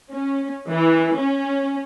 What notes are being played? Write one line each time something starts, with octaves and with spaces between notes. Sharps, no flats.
C#4
E3
C#4